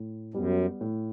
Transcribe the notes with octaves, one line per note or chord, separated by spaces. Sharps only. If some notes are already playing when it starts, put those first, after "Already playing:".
Already playing: A2
F#2 G3 B3
A2